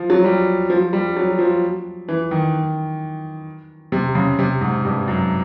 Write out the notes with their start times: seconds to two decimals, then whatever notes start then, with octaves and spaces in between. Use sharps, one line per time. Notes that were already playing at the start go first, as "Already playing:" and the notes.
Already playing: F3
0.10 F#3
0.24 G3
0.70 F3
0.93 G3
1.16 F#3
1.39 F3
2.08 E3
2.31 D#3
3.92 C3
4.15 C#3
4.39 C3
4.61 G#2
4.85 G2
5.08 F#2